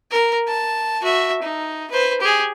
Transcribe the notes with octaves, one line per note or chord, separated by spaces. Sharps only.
A#4
A5
F#4 E5
D#4
B4 C5
G4 G#4